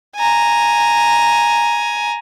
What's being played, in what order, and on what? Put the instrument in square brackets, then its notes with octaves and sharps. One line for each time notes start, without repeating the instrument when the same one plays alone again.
[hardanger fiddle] G#5 A#5